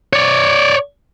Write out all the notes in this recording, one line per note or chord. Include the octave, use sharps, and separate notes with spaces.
C#5 D5